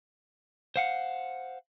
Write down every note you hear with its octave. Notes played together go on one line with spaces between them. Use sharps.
C5 F5 F#5